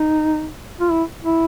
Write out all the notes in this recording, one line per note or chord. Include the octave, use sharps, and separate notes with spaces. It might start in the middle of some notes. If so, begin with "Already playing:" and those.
Already playing: D#4
F4
E4
E4